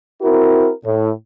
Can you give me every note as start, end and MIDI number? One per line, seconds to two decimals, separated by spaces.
0.22 0.70 60
0.22 0.70 64
0.22 0.70 66
0.22 0.70 70
0.85 1.08 45